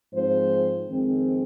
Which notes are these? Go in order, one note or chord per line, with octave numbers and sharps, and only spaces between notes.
G#2 F3 G#3 C4 C5
F2 D#3 G#3 C4